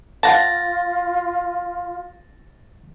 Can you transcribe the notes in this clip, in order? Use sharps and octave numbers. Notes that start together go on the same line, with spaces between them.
F4 F5 F#5 A5 A6 A#6